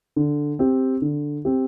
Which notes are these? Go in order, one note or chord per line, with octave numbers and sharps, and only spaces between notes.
D3
C4 G4
D3
C4 G4